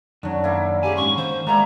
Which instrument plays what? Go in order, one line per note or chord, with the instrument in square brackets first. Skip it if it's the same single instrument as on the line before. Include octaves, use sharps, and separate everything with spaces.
[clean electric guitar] F#2 D#3 [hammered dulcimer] D3 F#3
[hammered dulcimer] A#3 E4
[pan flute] G4 [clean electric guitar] G#4 F5 G#5
[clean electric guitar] G#2 C#4 C6 [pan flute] C#6
[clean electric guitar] D#3 [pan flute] C5
[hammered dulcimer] G3 A#3 E4 [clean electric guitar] G#3 [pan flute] A#5